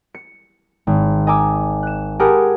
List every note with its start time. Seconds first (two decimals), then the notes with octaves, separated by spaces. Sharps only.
0.14 C#7
0.87 G#1
1.27 D#5 G#5 A#5 D6 E6
1.83 F#6 E7
2.19 G4 G#4 A#4 F#5 A5 B5